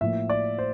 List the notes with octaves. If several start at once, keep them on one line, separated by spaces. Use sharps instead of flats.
A2 F3 A#3 E5
D5
C5